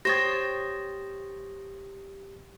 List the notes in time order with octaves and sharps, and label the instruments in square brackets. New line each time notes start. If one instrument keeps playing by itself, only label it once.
[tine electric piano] G4 D#6 [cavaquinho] C5 C#5 G5 [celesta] A6 A#6